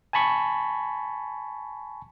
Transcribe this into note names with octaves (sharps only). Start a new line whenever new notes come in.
G#5 A5 B5 C#6